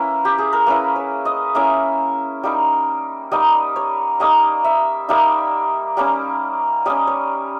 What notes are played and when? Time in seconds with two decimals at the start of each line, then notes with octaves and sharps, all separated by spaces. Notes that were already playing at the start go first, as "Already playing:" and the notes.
Already playing: A#3 C#4 E4 B4
0.25 G4
0.38 G#4
0.53 A#4
0.66 A#3 C#4 E4 B4
0.96 C#5
1.25 D#5
1.55 A#3 C#4 E4 E5
2.43 G3 A#3 D#4
3.31 G3 A#3 D#4 D#5
3.76 C#5
4.20 G3 A#3 D#4 D#5
4.64 E5
5.09 G3 A#3 D#4 E5
5.97 G3 A#3 C#4
6.86 G3 A#3 C#4 D#5
7.07 C#5